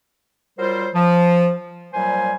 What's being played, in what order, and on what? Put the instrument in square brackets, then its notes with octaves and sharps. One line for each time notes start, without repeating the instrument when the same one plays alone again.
[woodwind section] F#3 G3 F4 A#4 C5
F3
A#2 F#3 G3 C5 G#5